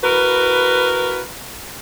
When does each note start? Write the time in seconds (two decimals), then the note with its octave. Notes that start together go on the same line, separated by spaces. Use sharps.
0.03 E4 F#4 A#4 B4